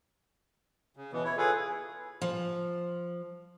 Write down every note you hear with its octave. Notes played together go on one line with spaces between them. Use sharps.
C#3
B2 E3 B3
E4 C#5
F4 G#4 A4 B4
F3